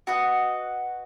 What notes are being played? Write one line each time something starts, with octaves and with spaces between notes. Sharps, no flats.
F#4 B4 D#5 F#5